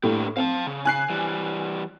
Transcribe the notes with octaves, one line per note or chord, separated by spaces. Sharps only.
A2 A#3 D4 G4
C4 F5 G#5 A5
C#3
G#5 F#6 C7
E3 G3